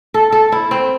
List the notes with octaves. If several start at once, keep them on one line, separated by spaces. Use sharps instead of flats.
A4
A4
E4
C4